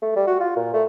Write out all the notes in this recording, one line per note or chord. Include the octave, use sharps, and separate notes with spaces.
A3
G3
F#4
F4
A#2
A3